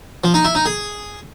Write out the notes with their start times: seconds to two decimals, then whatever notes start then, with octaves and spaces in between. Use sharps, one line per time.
0.24 F3
0.34 D#4
0.45 E4
0.55 D#4
0.66 G#4